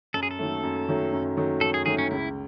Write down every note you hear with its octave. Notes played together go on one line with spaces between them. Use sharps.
F#2 A4
G#4
A4
D#3 F#3 A3
F#2
D#3 F#3 A3
F#2
D#3 F#3 A3
F#2 A4
G#4
D#3 F#3 A3 G#4
C#4
C#2 E4